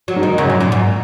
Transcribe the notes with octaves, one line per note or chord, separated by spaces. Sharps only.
F#3
G#2
D#3
F#2 C#3
A#2
A#2
G#2